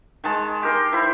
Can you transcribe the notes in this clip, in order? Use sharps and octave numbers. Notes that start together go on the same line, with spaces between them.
D#3 G#3 A5
G4 A#4 C6
E4 C5 B5